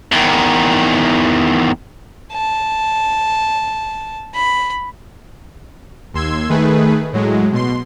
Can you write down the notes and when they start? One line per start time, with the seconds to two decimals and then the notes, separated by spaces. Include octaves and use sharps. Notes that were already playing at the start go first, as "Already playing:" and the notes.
0.12 E2 D#3
2.33 A5
4.34 B5
6.14 D#2 C6 E6 G#6
6.49 D#3 A3 G#4 B4
7.13 A2 F#3 G#3
7.52 B2 C6